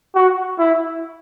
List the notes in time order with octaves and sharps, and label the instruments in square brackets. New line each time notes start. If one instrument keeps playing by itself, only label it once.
[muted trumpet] F#4
E4